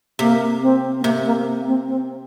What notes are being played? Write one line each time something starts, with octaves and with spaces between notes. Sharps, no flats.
C3 A#3
C4
C4
C3 A#3
A#3
A#3
C4
C4